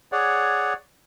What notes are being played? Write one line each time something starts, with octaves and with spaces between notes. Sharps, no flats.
G#4 C#5 D5 F#5